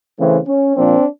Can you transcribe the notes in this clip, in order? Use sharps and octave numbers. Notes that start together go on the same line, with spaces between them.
C#3 E3 A3 C4
C#4
A#2 F3 A#3 C4 D4